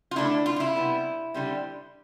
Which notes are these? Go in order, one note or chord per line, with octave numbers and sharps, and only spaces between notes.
F4
D3 A3 D4 E4
F4
F4
E4
C3 G3 B3
D3 G3 C4